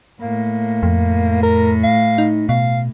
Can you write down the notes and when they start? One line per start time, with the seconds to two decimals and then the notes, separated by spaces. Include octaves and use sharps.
0.22 A2 A#3
0.83 F2
1.43 A#4
1.83 F5
2.18 D#4
2.49 B2 F5